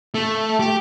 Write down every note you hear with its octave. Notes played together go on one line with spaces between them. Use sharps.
A3
G4